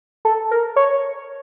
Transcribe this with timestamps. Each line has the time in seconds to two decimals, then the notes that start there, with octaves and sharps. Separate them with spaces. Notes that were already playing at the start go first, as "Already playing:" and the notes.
0.25 A4
0.51 A#4
0.76 C#5